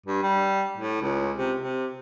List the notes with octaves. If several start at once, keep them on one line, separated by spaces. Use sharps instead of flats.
G2
G3
A2
C#2
C3
C3